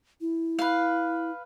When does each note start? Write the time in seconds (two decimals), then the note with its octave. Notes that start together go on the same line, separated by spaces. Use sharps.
0.21 E4
0.59 B4 F5